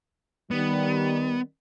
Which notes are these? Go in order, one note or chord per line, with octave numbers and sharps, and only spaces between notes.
D#3 G3 B3